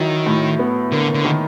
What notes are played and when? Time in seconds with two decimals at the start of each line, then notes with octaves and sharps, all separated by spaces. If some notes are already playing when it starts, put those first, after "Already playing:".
Already playing: D#3 F#3 E4
0.26 A2
0.59 B3
0.92 D3 A#3
1.14 D3
1.25 D#3